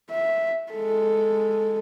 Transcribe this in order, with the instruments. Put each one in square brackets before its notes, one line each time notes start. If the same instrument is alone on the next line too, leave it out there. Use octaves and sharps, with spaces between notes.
[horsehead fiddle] E5
G#3 A4